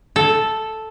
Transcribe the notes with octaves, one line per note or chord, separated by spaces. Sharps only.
A4